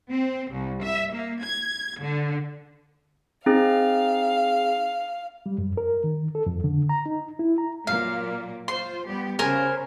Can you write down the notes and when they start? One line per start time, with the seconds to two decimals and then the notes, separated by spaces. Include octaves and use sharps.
0.10 C4
0.50 C2
0.82 E5
1.12 A#3
1.43 G#6
2.00 D3
3.46 C4 D#4 G#4 F5
5.46 G3
5.58 F#2
5.77 A#4
6.04 D#3
6.35 A4
6.46 F2
6.64 D3
6.89 A#5
7.06 D#4
7.39 E4
7.58 A#5
7.87 A#2 F#3 A#3 F5
8.68 F4 C5 C6
9.07 G3 B3 G4
9.39 C#3 A#4 C5 G#5